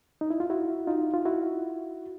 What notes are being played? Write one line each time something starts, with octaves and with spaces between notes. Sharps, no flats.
D#4
E4
F4
E4 F#4
D#4 F4
F4
E4 F#4